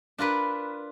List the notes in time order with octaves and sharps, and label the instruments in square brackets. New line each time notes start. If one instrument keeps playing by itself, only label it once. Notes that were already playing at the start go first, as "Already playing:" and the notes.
[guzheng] D4 F4 A#4 B4